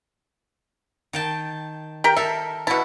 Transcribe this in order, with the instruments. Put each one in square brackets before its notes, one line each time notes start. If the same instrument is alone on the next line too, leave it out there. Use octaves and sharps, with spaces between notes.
[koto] D#3 G5 A5
[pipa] G4 A#4 G5
[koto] A4 A#4 [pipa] E5
[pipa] B2 A5 [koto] E4 F#4